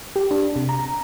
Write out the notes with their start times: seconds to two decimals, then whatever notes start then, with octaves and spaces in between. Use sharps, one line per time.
0.16 G4
0.31 D4
0.56 C3
0.69 A#5